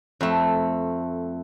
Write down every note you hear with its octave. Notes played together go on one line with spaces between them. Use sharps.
F2 A3